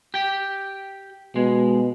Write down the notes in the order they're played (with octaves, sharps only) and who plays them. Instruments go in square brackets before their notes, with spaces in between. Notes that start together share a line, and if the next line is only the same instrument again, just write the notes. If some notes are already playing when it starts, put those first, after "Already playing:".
[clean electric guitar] G4 G5
[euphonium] B2 [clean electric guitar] G#3